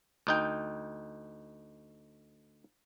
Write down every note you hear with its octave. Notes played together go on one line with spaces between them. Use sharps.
D2 D#4 G5